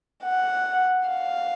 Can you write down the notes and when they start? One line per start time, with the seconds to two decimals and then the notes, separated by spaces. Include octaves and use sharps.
0.24 F#5
1.08 F5